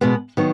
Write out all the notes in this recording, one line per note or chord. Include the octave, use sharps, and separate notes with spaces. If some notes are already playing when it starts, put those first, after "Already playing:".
B2 G#3 B3
D#3 F#3 B3